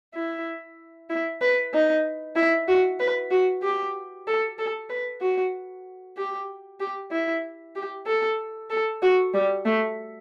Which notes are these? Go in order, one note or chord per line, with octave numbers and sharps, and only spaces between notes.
E4
E4
B4
D#4
E4
F#4
B4
F#4
G4
A4
A4
B4
F#4
G4
G4
E4
G4
A4
A4
F#4
G3
A3